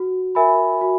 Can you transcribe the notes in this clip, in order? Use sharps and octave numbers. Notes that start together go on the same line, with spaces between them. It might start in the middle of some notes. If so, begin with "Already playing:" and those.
Already playing: F#4
A#4 E5 G#5 B5
F#4